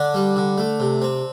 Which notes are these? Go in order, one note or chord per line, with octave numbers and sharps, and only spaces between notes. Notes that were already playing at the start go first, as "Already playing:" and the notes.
Already playing: D3 D4
G3
D3
A3
C3
C4